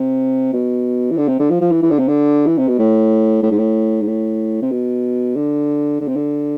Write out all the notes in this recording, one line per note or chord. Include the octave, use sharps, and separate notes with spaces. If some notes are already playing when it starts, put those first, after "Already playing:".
Already playing: C3
B2
E3
D3
C3
D3
F3
F3
E3
E3
D3
C3
D3
E3
C3
B2
A2
A2
G#2
A2
G#2
A2
C3
B2
D3
D3
C3
D3